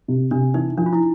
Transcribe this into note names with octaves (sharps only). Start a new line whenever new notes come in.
C3
C3 D4
E3 D#4
F3 D4
F4
E4